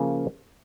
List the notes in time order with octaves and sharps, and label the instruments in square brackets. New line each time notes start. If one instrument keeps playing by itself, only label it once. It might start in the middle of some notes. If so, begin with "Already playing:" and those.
Already playing: [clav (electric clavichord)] C#3 F3 A#3